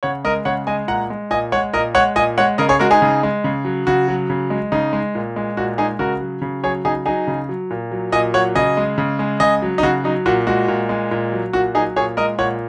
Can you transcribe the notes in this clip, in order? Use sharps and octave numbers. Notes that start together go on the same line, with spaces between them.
C#3 C#5 F#5
G#3 A#4 D#5
C#3 C#5 F#5
G#3 D#5 G#5
A#2 F#5 A#5
G#3
A#2 D#5 G#5
G#3 C#5 F#5
A#2 A#4 D#5
G#3 C#5 F#5
A#2 D#5 G#5
G#3 C#5 F#5
C#3 A#4 D#5
G#4 C#5
G#3 F#4 A#4
D#4 G#4
C#3
G#3
C#3
F#3
C#3 F#4
F#3
C#3
G#3
C#3 D#4
G#3
A#2
G#3
A#2 F#4
G#3 D#4 G#4
C#3 F#4 A#4
F#3
C#3
F#3 G#4 C#5
C#3 D#4 G#4
F#3 D#4 G#4
C#3
F#3
A#2
F#3
A#2 D#5 G#5
F#3 C#5 F#5
C#3 D#5 G#5
G#3
C#3
G#3
C#3 D#5 G#5
F#3
D#4
C#3 F#4
F#3 D#4
A#2 F#4
G#3 F#4
A#2
G#3
A#2
F#3
A#2 F#4
F#3 D#4 G#4
A#2 G#4 C#5
G#3 A#4 D#5
A#2 C#5 F#5